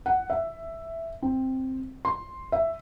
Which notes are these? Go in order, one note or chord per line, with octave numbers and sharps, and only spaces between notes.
F#5
E5
C4
C6
E5